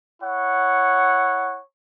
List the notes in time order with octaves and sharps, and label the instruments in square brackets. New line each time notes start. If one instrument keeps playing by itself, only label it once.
[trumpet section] E4 C#5 F#5